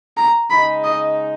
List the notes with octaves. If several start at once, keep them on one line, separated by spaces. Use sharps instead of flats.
A#5
C#3 G#3 D#4 B5
D#5